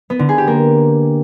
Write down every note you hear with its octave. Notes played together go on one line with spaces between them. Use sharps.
B3
D3
G#4
G4
A#3